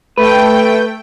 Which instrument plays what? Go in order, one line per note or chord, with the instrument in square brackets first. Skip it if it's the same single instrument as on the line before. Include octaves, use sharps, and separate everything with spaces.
[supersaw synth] A3 G5 [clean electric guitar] B4